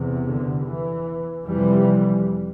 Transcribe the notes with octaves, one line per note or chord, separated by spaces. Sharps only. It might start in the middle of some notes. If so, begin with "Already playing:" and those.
Already playing: E2 C3
D3
E3
F2 C3 E3 G3